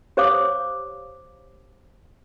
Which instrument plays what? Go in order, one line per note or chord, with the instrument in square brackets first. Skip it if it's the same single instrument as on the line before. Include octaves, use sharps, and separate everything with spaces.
[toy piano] G4 C5 C#5 F5 D6 D#6